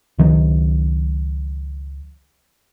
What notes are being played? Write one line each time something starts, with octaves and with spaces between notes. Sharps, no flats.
C#2 D#3 F#3